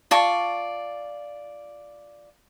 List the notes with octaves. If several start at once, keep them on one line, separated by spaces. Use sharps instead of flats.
F4 D5 A5 C#6